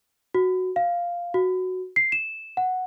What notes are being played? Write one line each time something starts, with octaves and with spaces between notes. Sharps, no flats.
F#4
F5
F#4
C7
E7
F#5